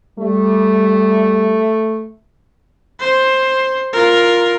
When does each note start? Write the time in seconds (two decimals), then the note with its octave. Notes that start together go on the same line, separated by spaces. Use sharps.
0.19 G3 A3
3.00 C5
3.93 F4 A#4